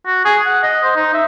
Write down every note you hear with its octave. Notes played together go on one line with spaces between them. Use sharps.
F#4
G#4
F#5
D#5
C5
D#4
E5